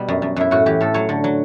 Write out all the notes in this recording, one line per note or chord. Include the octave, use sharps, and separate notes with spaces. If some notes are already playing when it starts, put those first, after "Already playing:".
Already playing: B2 G3
F#2
F#2
F#2 E4
A2 F#4
E3 G4
A2 A4
F#3 C#5
D3
F#3